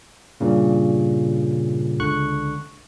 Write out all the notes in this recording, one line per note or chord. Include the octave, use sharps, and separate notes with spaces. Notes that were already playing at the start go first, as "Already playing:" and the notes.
G2 A#2 C#3
C#2 D3 C#6 F#6